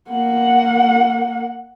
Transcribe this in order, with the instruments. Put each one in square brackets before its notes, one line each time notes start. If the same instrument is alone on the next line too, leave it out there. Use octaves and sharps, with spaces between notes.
[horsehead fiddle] A#3 F#5